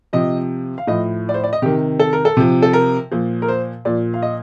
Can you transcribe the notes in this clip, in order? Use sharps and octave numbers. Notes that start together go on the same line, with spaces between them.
C3 F3 D#5
F5
A2 F3 D#5
D5
C5
D5
D#5
C3 D#3 G4
A4
A#4
A4
C3 F3
A4
A#4
A#2 F3
A#4
C5
A#2 F3 D5
F5
D#5